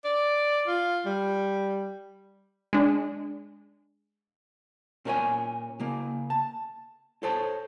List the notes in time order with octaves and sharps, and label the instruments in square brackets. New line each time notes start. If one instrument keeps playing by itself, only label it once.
[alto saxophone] D5
F4
G3
[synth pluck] G#3 D4
[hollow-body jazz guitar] A#2 C#4 A#4 C5 C#5 G#5
C#3 A#3
A5
A4 C5 C#5 A5